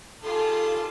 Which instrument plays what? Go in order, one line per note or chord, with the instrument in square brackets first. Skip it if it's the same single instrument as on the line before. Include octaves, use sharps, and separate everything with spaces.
[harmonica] D#3 G3 A5 [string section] F4 G#4 [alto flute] A4